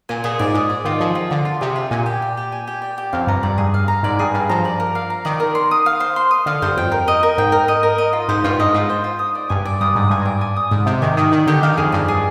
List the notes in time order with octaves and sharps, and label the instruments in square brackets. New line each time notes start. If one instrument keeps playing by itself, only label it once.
[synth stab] A#2 [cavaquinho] G#5
[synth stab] A#2 [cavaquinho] G#4
[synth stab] G#2 [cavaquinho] D5
[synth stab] G#2 [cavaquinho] G#4
[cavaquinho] D5
[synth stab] D#3 [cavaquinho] F4
[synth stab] F3 [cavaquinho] G#4
[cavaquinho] F4
[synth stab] D3 [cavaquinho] D5
[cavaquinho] F4
[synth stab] C3 [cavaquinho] G#4
[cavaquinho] F4
[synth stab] A#2 [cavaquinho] G#5
[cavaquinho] G4
D5
G4
G#5
G4
D5
G4
[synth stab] F2 [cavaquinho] F5
[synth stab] G2 [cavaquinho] A#5
[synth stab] G2 [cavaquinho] D5
[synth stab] G2 [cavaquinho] G#4
[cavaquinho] F5
A#5
[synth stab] G#2 [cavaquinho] D5
[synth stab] G2 [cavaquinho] G#4
[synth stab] G2 [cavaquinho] F5
[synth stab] F3 [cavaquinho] A#5
[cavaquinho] D5
A#4
F5
A#5
[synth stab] D#3 [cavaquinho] D5
[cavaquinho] A#4
C6
D#6
F5
C5
C6
D#6
[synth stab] D3 [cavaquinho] F5
[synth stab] G2 [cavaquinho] C5
[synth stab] F2 [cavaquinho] G5
[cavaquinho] A#4
D#5
A#4
[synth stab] G#2 [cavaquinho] G5
[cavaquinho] A#4
D#5
A#4
D#5
F4
[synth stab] G#2 [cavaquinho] C5
[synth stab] G2 [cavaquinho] F4
[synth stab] G#2 [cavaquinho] D#5
[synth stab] G#2 [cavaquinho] F4
[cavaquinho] C5
F4
D#6
D5
[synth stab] G2 [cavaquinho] G#5
[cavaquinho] D5
[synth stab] G2 [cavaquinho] D#6
[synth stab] G#2 [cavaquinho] D5
[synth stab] G2 [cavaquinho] G#5
[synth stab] G2 [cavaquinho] D5
[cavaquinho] G#5
D#6
[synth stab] G#2 [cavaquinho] D5
[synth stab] C3 [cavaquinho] G4
[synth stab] D#3 [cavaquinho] G#5
[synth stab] D#3 [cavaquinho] D#6
[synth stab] D#3 [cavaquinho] D5
[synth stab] D3 [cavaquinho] G4
[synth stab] D#3 [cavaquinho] F5
[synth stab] F2 [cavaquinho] G#4
[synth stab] G2 [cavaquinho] D5
[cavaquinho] G#4